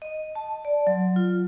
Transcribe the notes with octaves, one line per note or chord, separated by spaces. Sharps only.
D#5
A5
D5
F#3
F4